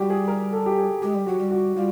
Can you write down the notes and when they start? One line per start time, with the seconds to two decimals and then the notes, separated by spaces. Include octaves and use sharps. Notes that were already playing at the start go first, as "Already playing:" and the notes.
Already playing: G3 F#4 G4
0.10 G#4
0.28 A#4
0.53 A4
0.66 G4
0.78 G#4
1.02 G#3 G4
1.14 G3
1.26 F#3 F#4
1.39 G3
1.51 F#4
1.76 G3 F4